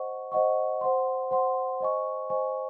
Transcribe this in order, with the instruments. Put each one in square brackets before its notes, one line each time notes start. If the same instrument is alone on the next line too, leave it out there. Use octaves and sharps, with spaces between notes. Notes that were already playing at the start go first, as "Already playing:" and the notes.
Already playing: [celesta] C5 D#5 F#5 C#6
C5 D#5 F#5 C#6
C5 F#5 C6
C5 F#5 C6
C5 D#5 G#5 C#6
C5 D#5 G#5 C#6